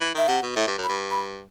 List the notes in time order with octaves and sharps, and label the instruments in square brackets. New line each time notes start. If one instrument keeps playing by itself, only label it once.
[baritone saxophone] E3
[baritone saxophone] D#3 [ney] E5
[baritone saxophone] C3 [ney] F#5
[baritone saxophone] B2
[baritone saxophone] A2 [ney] E5
[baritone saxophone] G2
F#2
[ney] B5
[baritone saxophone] G2
[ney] B5